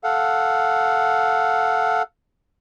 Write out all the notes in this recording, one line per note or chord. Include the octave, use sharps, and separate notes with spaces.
A4 F5 F#5